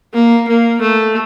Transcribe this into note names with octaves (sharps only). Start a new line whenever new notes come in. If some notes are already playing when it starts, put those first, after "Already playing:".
A#3
A#3
A3